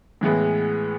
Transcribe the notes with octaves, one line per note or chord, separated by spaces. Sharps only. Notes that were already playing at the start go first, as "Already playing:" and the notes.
A2 E3 G#3 B3